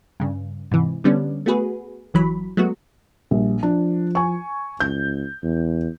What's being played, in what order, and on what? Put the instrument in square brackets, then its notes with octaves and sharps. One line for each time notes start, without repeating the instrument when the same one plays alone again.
[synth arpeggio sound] G2 C#3
G#2 C3 E3
D3 G3 B3 C#4 D5
A3 B3 F#4 G#4 B4
G1 E3 F#3 B5
F#3 G#3 A3 B3 F#4
[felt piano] A#1 [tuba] G3
[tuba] F3 [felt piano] D4
[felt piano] G#5 C#6
[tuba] C#2 [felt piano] G6
[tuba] E2